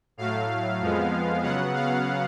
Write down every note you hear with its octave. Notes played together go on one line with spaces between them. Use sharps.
A2 F#3 A3 F5
F2 F3 G#3 B3
C#3 F#3 B3 F#5
F5